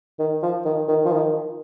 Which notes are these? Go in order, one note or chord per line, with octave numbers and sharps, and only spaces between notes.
D#3
F3
D#3
D#3
F3
D#3